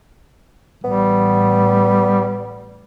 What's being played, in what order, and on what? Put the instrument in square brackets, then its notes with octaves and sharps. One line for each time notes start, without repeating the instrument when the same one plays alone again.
[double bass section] A1 [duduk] G3 [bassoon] B3